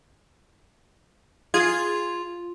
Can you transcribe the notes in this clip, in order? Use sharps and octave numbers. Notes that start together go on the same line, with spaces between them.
F4 G#4 G#6